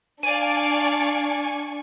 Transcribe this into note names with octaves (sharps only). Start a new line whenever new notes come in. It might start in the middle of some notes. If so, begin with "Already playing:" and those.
D4 D5 F5 G#5 C#6